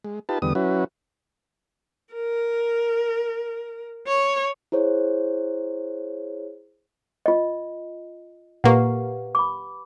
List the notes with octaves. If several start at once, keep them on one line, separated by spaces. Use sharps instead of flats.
G#3
D#4 F4 G4 B4 A5
E2 D3 G3 B3 D#6
F#3 C#4 E4 F#4 B4
A#4
C#5
E4 G#4 C5 C#5
F4 D#5
A#2 A#3 G4 B4 F#5
B5 D6